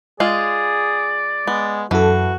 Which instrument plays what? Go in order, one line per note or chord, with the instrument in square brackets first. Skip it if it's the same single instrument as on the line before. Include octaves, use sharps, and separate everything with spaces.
[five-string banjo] G#3 F4 [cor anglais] G#4 [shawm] D5
[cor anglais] G#3 [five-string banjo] B3
[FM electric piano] F#2 A4 [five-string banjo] E3 [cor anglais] F#4